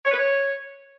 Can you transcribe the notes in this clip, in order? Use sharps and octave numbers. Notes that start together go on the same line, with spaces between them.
C#5
B4
C#5